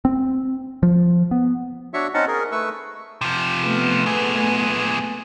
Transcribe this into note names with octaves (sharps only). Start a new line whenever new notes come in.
C4
F3
B3
D4 F#4 C#5 E5 C#6
C4 C#4 D#4 D#5 F#5 A5
G#4 A#4
A3 B4 C#6 E6
C3 F3
A3 B3
A#2 G#4